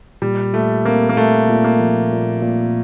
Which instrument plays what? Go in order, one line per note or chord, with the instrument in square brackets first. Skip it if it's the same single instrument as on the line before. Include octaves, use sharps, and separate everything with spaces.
[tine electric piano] A#2 [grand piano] G3
[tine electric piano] A#2 [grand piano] A3
[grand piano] A#3 [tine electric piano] C4
[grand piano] A#3
[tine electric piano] A#2 [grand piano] A3
[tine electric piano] A#2
[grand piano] A#3
[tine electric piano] F3
A#2
A#2